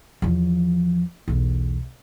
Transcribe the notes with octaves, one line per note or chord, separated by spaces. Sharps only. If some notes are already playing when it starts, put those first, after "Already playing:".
E2 F3
B1 E2